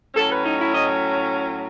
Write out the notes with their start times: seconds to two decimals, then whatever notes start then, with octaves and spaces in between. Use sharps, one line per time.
0.14 A2 F#3 C#4 A4
0.29 B4
0.43 D#4
0.58 E4
0.73 D#5